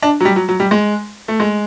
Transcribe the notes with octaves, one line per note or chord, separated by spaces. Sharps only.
D4
F#3
G3
F#3
F#3
G3
G#3
A3
G#3